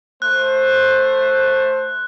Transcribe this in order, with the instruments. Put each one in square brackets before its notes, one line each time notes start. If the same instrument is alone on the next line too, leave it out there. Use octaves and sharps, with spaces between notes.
[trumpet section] A3 C5 [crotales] F#6